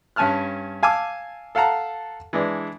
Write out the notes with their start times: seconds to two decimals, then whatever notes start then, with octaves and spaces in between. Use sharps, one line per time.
0.16 G2 C#4 G#5 A5 F6 F#6
0.83 F5 G#5 A5 D6 E6
1.55 A4 F5 F#5 A5 A#5
2.33 E3 G#3 D4